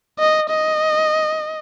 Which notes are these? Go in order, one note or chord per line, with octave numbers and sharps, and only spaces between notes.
D#5
D#5